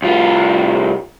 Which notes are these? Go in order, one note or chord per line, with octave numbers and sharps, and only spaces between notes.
C2 F4